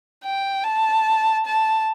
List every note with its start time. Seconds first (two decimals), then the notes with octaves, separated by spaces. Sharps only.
0.25 G5
0.64 A5
1.46 A5